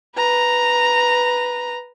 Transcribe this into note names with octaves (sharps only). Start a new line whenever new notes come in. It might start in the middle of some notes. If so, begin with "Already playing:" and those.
B4 A#5